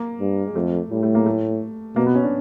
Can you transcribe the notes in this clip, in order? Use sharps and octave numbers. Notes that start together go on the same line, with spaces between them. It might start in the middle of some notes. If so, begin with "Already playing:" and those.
Already playing: A#3
G2
G#3
F2 A3
A2 G3
A3
A#3
A3
B2 A#3
B3
C#4
D4